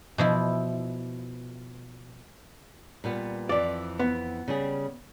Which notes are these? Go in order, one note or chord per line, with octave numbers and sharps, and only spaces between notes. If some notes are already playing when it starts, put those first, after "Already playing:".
B2 F3 E4
A#2 G3 B3
F2 E3 D5
B3
C#3 G3 G#4